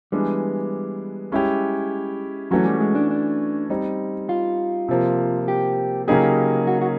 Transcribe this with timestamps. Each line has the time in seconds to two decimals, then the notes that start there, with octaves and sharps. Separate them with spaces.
0.12 E3 G3 G#3 B3 D4
1.32 G#3 C#4 E4 G4
2.51 E3 F#3 A3 C#4 F#4
2.65 G3
2.80 G#3
2.95 D4
3.11 D4
3.70 G3 C4 D#4
4.29 F4
4.88 C3 F3 A#3
5.48 G4
6.08 C#3 F#3 A#3 D#4 G4 G#4
6.67 F#4
6.81 F#4